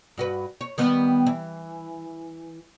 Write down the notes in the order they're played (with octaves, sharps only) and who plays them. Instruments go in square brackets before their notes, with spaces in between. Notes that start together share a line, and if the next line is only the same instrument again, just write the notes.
[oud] G2 F#4 B4
C#5
D#3 G3 B3
E3